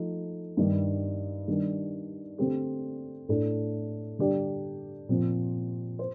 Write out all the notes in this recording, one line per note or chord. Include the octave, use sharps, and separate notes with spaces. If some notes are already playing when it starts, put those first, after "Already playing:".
Already playing: F3 A3 D#4
G2 D#3 G3
D#3 G3 D4
D3 A3 C4 G4
A2 A3 D4
D3 G3 D4 G4 D5
A#2 F3 C4
C5